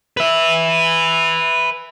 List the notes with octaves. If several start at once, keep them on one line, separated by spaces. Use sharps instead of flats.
B4 E5